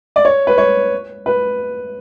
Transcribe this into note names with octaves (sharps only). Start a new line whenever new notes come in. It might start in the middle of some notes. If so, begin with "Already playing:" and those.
D5
C#5
B4
C#5
B4